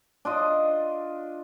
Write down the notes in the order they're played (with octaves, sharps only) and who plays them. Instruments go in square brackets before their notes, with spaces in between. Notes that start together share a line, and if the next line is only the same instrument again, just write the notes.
[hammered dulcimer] D4 F4 D#5